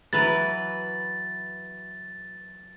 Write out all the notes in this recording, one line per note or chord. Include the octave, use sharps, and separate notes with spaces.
E3 F#3 B4 A6